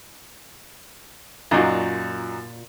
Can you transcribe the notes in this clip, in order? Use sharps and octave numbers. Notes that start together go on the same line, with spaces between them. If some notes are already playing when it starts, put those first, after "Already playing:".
F#2 A#2 D#4 F4 F#4